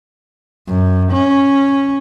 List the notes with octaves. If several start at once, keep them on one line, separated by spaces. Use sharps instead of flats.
F#2
C#4